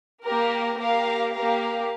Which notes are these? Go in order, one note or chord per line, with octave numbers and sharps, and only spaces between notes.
A#3 G4 A#4
A#3 G4 A#4 F5
A#3 G4 A#4 F5